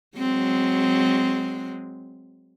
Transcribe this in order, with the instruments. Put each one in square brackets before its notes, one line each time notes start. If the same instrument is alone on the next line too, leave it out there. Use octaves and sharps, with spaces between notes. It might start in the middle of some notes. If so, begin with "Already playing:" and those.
[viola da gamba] F#3 G#3 C4